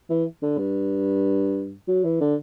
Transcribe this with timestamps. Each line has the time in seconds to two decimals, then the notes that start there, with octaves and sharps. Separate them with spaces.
0.09 E3
0.42 D3
0.58 G2
1.88 F#3
2.04 E3
2.20 D3